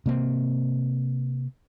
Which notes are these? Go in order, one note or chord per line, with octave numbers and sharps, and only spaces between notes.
C3 A#3 C4